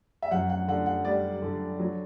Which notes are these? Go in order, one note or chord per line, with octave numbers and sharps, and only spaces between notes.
E5
F#2 F#5
F#5
D3 F#5
F#5
G3 D5
D3
F#3